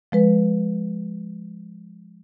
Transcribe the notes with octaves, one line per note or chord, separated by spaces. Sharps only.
F3 G#3 B4